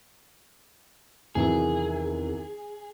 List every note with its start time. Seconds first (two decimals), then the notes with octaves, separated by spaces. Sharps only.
1.35 E2 C3 D#3 E3 F#3 G#4